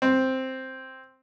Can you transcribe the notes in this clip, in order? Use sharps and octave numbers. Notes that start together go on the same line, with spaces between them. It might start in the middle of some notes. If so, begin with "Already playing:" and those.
C4